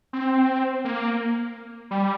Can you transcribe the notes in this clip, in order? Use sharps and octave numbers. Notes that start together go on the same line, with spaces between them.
C4
A#3
G3